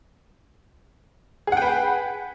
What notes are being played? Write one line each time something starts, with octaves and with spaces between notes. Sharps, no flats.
G#4 B4 F#5 G5